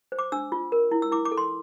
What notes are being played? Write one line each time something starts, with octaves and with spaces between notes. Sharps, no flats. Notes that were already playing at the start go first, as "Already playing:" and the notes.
C5
D6
D4 E6
F4
A#4
E4
E6
E4 D6
D6
A4
C6